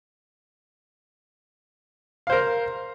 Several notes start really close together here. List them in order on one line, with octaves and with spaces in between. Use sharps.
F5 C5 A#4